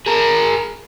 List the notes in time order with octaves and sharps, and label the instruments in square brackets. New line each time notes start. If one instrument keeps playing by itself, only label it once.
[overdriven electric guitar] G#4 A#4